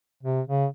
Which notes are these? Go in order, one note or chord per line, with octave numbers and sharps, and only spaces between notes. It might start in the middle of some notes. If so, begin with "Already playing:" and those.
C3
C#3